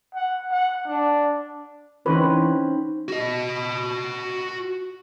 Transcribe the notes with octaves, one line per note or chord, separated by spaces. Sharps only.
F#5
F#5
D4
E3 C4 C#4 D#4 B4
F#4 D#5